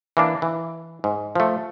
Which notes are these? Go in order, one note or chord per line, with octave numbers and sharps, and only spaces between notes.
E3 A#3 D4
E3
G#2
F3 A3